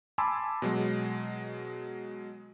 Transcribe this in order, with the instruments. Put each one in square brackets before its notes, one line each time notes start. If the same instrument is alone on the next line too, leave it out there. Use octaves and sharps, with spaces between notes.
[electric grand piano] G#5 A5 B5 C6 D6 E6
B2 F#3 G#3